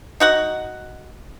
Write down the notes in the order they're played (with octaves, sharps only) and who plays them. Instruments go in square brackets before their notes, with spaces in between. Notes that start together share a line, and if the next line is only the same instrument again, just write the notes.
[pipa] D#4 F#4 F#5